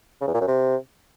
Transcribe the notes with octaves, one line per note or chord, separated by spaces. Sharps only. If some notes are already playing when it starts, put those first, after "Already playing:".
C#3
E2
A#2
F#2
C3